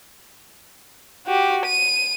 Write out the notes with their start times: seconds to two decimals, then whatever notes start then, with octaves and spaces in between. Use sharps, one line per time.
1.27 F#4 G4
1.66 D#7